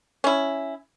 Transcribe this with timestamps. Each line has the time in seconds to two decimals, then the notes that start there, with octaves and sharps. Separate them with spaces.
0.24 C#4 E4